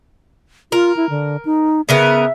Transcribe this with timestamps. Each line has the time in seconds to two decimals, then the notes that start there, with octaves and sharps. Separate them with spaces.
0.72 F4 A#4
0.96 E4
1.10 D3
1.45 D#4
1.89 C#3 B3 A#4 E5